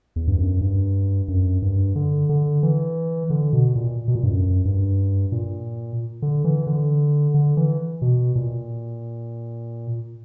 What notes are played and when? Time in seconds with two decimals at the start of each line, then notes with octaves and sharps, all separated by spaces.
0.16 E2
0.27 G2
0.39 F#2
0.61 G2
1.28 F#2
1.62 G2
1.95 D3
2.29 D3
2.63 E3
3.30 D3
3.53 B2
3.75 A#2
4.08 B2
4.15 A#2
4.23 G2
4.31 F#2
4.65 G2
5.32 A#2
6.22 D3
6.44 E3
6.67 D3
7.34 D3
7.57 E3
8.02 B2
8.35 A#2